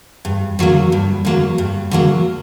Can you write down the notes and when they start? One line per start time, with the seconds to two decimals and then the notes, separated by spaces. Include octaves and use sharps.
0.25 G2
0.59 D3 F#3 A#3
0.92 G2
1.25 D3 F#3 A#3
1.58 G2
1.91 D3 F#3 A#3